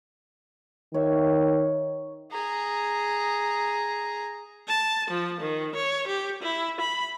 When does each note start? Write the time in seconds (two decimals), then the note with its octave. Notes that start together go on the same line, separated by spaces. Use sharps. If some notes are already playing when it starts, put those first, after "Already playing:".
0.94 D#3 C#5 E5
2.32 G#4 A#5
4.69 A5
5.10 F3
5.41 D#3
5.75 C#5
6.07 G4
6.42 E4
6.80 B5